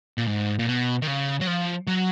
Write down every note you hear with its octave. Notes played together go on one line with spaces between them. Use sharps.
A#2
G#2
A#2
B2
D#3
C#3
F#3
F3
F#3